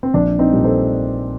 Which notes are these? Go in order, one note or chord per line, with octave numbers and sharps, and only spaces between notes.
C4
A#1 D4
C4 D#4
A#2 G3
A4 C5